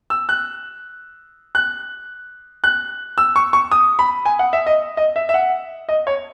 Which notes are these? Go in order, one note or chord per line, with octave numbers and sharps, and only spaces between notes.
E6
F#6
F#6
F#6
E6
C#6
C#6
D#6
B5
G#5
F#5
E5
D#5
D#5
E5
E5
F#5
D#5
C#5